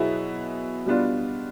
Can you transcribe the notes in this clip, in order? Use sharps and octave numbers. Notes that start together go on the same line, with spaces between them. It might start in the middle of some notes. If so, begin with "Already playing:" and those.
Already playing: B2 F#3 B3 E4 G#4
B2 G3 B3 D4 F4